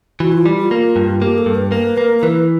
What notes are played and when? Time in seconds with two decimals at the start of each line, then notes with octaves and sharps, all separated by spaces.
0.20 E3 F#4
0.32 F4
0.46 G3
0.58 F4
0.71 A#3
0.96 G2
1.21 A#3 G4
1.38 A4
1.46 G2
1.55 B4
1.72 A#3 B4
1.97 A#3 A#4
2.18 A#4
2.23 E3 B4